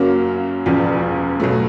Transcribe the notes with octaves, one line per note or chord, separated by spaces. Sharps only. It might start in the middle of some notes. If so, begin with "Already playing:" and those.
Already playing: F#2 C#3 F#3 A#3
E1 E2 C#3 F3
B2 F#3 A3